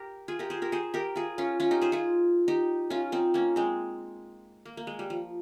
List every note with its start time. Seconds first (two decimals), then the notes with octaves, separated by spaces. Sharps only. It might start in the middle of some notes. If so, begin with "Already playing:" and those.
Already playing: G4 A#4
0.28 F4 G#4
0.39 G4 A#4
0.50 G#4 C5
0.62 G4 A#4
0.72 G#4 C5
0.94 G4 A#4
1.16 F4 G#4
1.38 C#4 F4
1.60 C#4 F4
1.71 D#4 G4
1.81 G#4 C5
1.92 F4 G#4
2.48 D#4 G4
2.90 C#4 F4
3.12 C4 D#4
3.34 A#3 C#4
3.56 G#3 C4
4.65 A#3
4.77 A#3
4.87 G#3
4.99 G3
5.10 F3